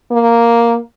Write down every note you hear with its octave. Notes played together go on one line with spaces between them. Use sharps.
A#3